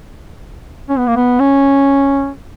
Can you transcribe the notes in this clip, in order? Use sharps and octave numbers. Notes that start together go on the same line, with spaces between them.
C#4
B3
A#3
B3
C#4